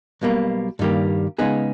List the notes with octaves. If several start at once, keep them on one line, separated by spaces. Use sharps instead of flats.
B1 B2 G3 A#3
G2 D#3 G3 A#3
C#3 G#3 B3 D#4 G#4